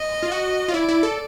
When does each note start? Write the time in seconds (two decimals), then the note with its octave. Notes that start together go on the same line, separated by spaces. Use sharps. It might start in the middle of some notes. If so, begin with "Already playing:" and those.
Already playing: D#5
0.23 F4
0.32 F#4
0.68 F4
0.74 E4 D5
0.89 E4
1.03 A4